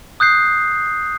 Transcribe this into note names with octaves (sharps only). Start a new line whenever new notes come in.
D#6 F#6 G6 C7